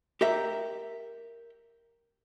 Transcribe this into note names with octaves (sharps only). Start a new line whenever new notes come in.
G4 A#4 E5